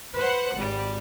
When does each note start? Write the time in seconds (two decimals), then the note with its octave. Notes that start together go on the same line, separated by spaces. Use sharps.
0.15 B4 C5 F#5
0.56 G#1 G3